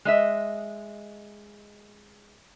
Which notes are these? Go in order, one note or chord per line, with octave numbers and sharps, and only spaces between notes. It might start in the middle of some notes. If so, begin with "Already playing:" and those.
G#3 D#5 E5